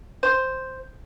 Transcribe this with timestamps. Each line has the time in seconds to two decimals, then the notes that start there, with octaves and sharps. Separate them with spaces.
0.23 C5